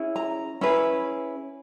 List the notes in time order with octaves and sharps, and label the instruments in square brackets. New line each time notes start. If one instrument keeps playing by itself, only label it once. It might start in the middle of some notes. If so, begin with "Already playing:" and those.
Already playing: [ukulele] C#4 E4 G#4
A#5
C#4 E4 G#4 B4